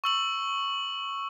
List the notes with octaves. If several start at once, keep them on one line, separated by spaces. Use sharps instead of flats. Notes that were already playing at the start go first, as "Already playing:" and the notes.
C#6 E6 F#7